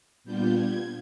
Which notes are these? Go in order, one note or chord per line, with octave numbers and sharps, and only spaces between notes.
A#2 G3 B3 D4 F4 G6
G#6